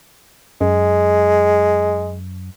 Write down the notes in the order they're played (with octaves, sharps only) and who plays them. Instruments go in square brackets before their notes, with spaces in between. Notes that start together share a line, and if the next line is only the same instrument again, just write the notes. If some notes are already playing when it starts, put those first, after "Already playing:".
[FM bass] F#2 [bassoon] G#3